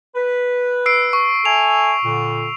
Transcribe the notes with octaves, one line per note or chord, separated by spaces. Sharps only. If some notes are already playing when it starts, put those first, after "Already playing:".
B4
E6 C7 D7
C#6
A4 E5 G#5 F7
A#2 D3